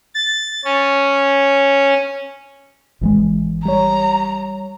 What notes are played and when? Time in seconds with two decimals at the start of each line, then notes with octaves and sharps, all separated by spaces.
0.14 A6
0.64 C#4
3.01 G#1 E3 G#3
3.65 G3 C#5 A#5